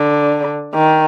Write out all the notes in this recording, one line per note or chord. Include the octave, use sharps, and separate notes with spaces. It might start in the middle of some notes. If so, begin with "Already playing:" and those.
Already playing: D3
D#3